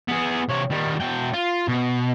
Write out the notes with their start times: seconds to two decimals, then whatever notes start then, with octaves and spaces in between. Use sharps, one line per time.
0.09 B3 G#4
0.49 C3 C#5
0.71 D#3 G3
1.01 B2 G5
1.34 F4
1.68 B2